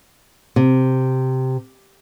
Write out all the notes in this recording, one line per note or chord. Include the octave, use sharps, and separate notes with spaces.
C3